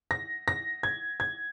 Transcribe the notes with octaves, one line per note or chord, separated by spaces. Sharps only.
A#6
A#6
G#6
G#6